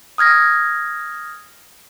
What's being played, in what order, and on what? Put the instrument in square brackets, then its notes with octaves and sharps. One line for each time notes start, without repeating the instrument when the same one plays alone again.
[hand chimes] D#6 F6 G#6 A#6